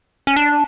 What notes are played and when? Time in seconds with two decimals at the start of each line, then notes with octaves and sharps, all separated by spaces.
0.27 C#4
0.36 D4